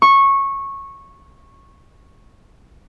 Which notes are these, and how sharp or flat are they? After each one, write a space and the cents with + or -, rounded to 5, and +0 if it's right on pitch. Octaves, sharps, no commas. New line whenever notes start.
C#6 -15